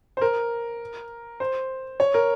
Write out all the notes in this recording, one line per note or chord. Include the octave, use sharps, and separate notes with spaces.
C5
A#4
C5
C#5
A#4